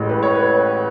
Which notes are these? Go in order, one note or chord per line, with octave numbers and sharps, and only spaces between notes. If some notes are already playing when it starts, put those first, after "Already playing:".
Already playing: A1 A2 G#3
B4
C#5
B4